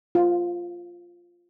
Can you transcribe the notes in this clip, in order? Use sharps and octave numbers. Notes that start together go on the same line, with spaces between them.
F4